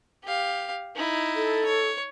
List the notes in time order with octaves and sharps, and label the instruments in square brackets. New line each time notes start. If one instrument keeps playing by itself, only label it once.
[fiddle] G4 F5
D#4 E4
[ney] A4
[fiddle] C#5